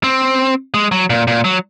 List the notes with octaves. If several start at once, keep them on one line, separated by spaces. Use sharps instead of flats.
C4
G#3
F#3
A#2
A#2
F#3